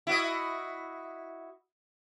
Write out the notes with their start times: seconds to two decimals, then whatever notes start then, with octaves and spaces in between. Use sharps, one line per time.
0.07 E4 F#4 D#5